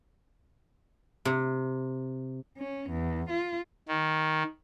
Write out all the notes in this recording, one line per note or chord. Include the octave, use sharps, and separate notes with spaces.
C3
C#4
E2
F4
D#3